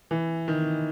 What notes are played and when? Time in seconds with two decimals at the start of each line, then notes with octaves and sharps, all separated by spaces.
0.11 E3
0.48 D#3